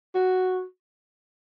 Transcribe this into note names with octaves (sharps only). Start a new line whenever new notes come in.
F#4